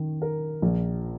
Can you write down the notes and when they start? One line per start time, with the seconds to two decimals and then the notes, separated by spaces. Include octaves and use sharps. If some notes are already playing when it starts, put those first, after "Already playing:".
Already playing: D#3
0.22 A#4
0.62 A#1